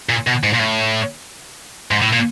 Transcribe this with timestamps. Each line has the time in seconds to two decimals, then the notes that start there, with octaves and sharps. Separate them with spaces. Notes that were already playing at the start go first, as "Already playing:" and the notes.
0.09 A#2
0.27 B2
0.43 G#2
0.54 A#2
0.59 A2
1.91 G#2
2.02 A2
2.13 A#2